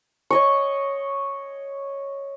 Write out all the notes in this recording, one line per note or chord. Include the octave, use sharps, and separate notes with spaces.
C#5 D#5 C#6